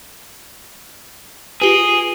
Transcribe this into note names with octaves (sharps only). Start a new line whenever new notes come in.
F4 G4 G#4 B4